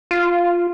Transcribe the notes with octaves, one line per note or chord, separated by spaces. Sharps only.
F4